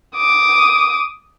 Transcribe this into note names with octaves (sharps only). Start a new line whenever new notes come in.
D6 D#6